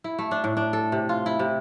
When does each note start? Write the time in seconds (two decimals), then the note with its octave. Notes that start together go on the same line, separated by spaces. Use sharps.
0.04 E4
0.19 A3
0.31 D4
0.44 A2
0.57 D4
0.73 A4
0.92 C3
1.09 F4
1.26 E4
1.39 C3